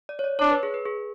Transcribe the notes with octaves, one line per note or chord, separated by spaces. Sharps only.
D5
C#5
D5
D4 C#5
B4
G#4
B4
G#4